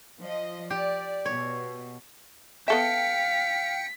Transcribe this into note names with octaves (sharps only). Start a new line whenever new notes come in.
F3 D#5
G4 D5
B2 C#5
B3 A4 E5 F5 G5 B6 C#7